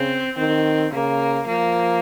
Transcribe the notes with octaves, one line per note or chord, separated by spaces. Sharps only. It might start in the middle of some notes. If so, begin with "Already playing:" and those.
Already playing: C#3 C4
D#3 C4
C#3 A#3
F3 A#3